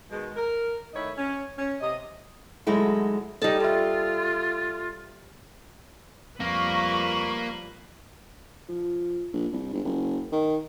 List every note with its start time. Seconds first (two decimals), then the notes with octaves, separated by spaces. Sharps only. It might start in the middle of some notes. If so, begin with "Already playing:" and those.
0.11 B2 D#3 G#3
0.36 A#4
0.94 D#3 A3 E4 C#5 D#5
1.17 C#4
1.58 C#4
1.81 C3 D#5
2.67 D2 F#3 G#3 D#4 E4 A4
3.42 G3 D#4 A4 D5 A5
3.60 F4 A4 E5
6.40 F2 F3 G3 A#3 A#4 B4 C#6
8.69 F3
9.33 A#1
9.53 C2
9.73 G1
9.84 F#1
10.32 D#3